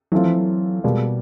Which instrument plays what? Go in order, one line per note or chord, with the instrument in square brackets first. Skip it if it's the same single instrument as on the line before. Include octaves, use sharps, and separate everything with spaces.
[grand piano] E3 A3 C4 F4 [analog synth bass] F#3
[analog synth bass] F3
F#3
[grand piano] B2 G3 A#3 [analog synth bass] G#3